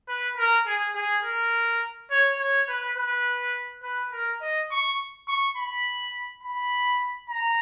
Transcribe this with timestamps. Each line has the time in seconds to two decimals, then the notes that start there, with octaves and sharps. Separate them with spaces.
0.09 B4
0.37 A#4
0.66 G#4
0.95 G#4
1.24 A#4
2.11 C#5
2.40 C#5
2.69 B4
2.97 B4
3.83 B4
4.12 A#4
4.41 D#5
4.71 C#6
5.28 C#6
5.57 B5
6.43 B5
7.29 A#5